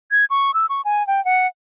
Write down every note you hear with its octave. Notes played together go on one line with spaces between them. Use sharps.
G#6
C#6
E6
C#6
G#5
G5
F#5